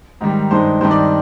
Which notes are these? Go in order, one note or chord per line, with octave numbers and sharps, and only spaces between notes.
G#2 D#3 G3
G2 D#3 G#3 D#4 C5
G2 D#3 G3 C4 D#4 C5
D5